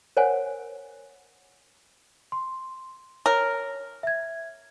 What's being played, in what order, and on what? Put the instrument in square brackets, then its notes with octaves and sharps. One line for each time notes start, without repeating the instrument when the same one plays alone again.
[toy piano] A#4 C5 C#5 F#5 G#5
[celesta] C6
[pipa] A#4 [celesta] C#5
[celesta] E5 G#6